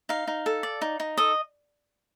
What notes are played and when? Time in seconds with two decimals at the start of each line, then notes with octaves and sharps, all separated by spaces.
0.09 D#4 F5
0.27 D#4
0.46 A4
0.63 D5
0.81 D#4
1.00 D#4
1.17 A4 D#5